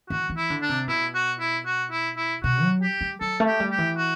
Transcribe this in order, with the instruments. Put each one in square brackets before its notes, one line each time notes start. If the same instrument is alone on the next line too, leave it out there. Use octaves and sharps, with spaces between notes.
[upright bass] E3 [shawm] F#4
[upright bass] E3
[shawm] E4
[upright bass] D3
[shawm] D4
[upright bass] C3
[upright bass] B2 [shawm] E4
[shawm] F#4
E4
F#4
E4
E4
[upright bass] B2 [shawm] F#4
[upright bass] F#3
[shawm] G4
[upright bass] G3
[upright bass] F#3 [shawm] A4
[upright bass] A3
[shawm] G4
[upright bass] G3
[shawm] G4
[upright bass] E3
[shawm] F#4